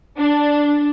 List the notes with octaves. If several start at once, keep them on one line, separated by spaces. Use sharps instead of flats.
D4